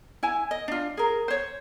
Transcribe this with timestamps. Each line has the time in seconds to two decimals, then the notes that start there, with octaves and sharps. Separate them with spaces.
0.23 E4 G#5
0.51 D#5
0.68 D4 F4
0.97 G#4 A#4
1.28 C5 C#5